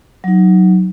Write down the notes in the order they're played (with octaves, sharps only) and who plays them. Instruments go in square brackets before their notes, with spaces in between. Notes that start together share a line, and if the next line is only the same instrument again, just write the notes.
[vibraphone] F#3 D#4